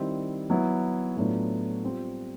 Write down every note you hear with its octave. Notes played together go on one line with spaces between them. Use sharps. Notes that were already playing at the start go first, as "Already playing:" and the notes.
Already playing: D#3 G3 C4 E4
F#3 B3 E4
A2 F#3 B3 D4 F4
G3 C4 F4